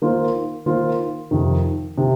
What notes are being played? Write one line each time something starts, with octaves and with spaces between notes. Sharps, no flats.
D#3 A#3 F4 C5
D#3 A#3 F4 C5
F2 C3 D#3
C3 D#3